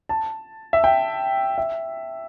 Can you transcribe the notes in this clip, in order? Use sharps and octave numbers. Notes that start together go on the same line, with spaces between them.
A5
E5
G5
E5